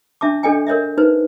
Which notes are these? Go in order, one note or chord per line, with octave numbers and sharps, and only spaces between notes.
D4 E5 A5 D6
D4 A4 D5 D#5 G5 G#5
A#4 C#5 D#5 E5
D#4 B4 C5